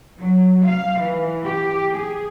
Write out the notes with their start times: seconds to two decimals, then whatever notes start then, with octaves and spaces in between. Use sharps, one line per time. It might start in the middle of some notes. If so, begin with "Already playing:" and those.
0.20 F#3
0.66 F5
1.00 E3
1.45 G4
1.96 G#4